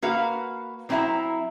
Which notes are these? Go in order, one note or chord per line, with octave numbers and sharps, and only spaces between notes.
A#3 F#4 B4 F5
F#3 C4 D4 E4 E5 A#5